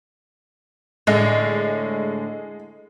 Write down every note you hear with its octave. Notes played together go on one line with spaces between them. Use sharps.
A2 D3 G#3